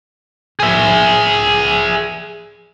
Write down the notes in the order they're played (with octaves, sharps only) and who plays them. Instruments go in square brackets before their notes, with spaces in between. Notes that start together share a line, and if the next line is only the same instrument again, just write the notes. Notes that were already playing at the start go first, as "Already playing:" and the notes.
[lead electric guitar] G#4 E5